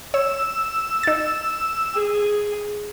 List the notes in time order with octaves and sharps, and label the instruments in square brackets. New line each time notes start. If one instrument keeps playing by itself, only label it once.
[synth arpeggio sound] C#5 [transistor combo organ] E6
[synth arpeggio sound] D#4 A6
[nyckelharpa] G#4